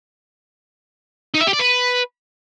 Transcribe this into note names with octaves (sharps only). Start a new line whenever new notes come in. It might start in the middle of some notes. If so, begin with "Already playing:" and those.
D#4
E5
G4
D5
B4